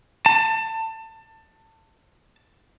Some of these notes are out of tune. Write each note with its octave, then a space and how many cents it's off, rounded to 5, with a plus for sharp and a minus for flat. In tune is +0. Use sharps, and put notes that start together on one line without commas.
A5 +25